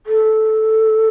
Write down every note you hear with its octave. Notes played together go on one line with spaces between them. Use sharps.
A4